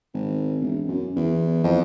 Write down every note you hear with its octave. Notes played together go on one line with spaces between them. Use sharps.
G#1
E1
F#2
E2
F2